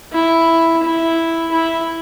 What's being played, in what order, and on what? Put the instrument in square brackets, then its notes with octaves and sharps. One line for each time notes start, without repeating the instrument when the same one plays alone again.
[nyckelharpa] E4
E4
E4